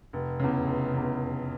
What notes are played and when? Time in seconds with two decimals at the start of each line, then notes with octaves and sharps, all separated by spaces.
0.13 F1
0.39 E2 C#3
0.67 F1
0.94 E2 C#3
1.21 F1